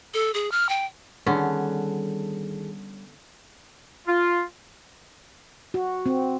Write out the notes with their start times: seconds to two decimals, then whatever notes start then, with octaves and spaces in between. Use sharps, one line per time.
0.14 A4
0.34 G#4
0.51 F6
0.69 G5
1.26 D3 D#3 G3 B3 C#4 G#4 A4
4.08 F4
5.74 F#4
6.06 C4